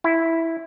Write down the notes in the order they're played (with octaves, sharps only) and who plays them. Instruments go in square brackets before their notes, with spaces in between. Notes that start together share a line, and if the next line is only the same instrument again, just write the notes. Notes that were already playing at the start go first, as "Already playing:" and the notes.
[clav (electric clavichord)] E4